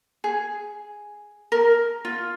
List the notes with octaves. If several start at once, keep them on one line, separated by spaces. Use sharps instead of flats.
G#4
A#4
F4